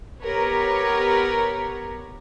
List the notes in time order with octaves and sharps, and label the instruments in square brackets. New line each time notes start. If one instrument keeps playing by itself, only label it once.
[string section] B3 G4 A#4 B4 C#5